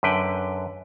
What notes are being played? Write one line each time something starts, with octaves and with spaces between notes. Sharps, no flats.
F#2 D3 B4 G5